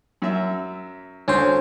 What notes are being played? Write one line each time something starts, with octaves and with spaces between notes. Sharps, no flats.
F#2 E5
D2 C#4 C5